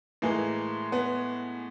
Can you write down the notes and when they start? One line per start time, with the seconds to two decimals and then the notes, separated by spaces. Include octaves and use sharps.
0.22 A2 E3 G#3 A#3
0.92 B3